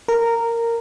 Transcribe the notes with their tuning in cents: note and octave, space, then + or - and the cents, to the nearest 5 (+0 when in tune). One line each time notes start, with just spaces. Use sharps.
A#4 -10